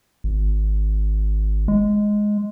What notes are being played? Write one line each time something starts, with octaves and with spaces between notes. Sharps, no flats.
G#1
G#3